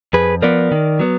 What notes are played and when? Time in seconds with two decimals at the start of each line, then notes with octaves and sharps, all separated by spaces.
0.13 F2 G#4 B4
0.42 F3 B3 A#4 D5
0.72 D#3
0.99 F#3 B3